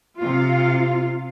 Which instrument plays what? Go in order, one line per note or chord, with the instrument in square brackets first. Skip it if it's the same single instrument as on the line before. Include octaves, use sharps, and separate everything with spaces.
[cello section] C3 F5 [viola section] F4